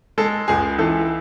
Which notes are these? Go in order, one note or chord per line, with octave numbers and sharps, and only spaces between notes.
G#3 A4
C#2 G#4
E3 A4